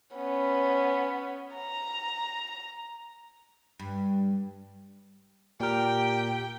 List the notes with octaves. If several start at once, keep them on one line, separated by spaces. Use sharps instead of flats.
B3 C#4
A#5
G2
A#2 G4 A#4 G5